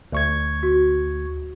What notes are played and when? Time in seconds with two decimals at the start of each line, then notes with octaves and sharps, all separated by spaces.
0.12 D2 C#6 G#6
0.63 F#4